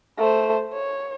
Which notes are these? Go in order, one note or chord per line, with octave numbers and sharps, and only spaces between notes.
A3 C5
C#5